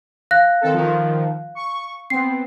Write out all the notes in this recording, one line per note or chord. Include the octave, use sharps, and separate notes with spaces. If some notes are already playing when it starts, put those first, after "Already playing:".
F5 F#6 A#6
D#3 C4 A4
D#3 F3
C#6
B3 C4 C7